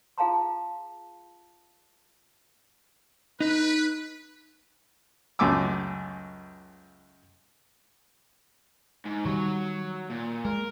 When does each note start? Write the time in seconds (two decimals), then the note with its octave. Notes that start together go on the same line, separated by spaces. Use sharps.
0.18 F4 G#4 F5 A5 A#5 C6
3.41 D#4 B4
5.39 C#2 F#2 A3 G#5 D6 E6
9.06 G#2
9.25 D#3 F#3 G3 C#5
10.10 A#2
10.45 G#3 A#4